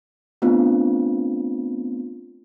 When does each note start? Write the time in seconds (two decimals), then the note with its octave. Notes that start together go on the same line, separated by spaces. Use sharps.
0.42 A3 B3 C4 D4 F4